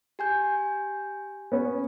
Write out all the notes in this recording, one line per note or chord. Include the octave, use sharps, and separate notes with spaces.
G4 G#5 G6
B3 C#4